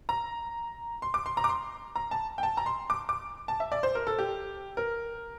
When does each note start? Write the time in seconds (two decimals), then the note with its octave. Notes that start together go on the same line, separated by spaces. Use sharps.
0.09 A#5
1.02 C6
1.14 D6
1.26 C6
1.37 A#5
1.44 D6
1.49 C6
1.96 A#5
2.11 A5
2.38 G5
2.43 A5
2.57 A#5
2.66 C6
2.90 D6
3.09 D6
3.48 A5
3.60 E5
3.72 D5
3.83 C5
3.95 A#4
4.07 A4
4.18 G4
4.77 A#4